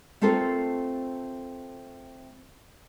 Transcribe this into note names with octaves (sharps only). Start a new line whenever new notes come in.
A3 C4 F4 A4 A#4 C5